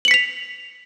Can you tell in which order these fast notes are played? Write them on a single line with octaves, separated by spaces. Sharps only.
F#7 C#7 B6 F7